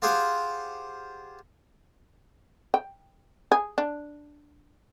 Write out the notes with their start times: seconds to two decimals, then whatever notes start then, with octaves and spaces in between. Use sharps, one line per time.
0.02 F4 G4 G#4 C5 F5 F#5
2.74 G5
3.52 G#4
3.78 D4